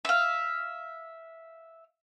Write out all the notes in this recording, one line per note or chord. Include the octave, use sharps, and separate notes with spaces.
E5 F5